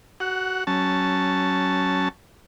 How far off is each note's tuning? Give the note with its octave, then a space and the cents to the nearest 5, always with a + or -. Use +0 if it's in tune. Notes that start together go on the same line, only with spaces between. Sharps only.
F#4 +25 F#5 +0
F#3 +20 C#4 +0 A5 +0